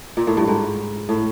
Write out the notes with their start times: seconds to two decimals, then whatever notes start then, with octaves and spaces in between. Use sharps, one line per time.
0.17 A#2
0.27 A2
0.37 G2
0.47 G#2
1.09 A2